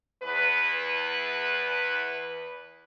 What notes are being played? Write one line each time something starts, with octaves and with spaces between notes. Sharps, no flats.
E2 B4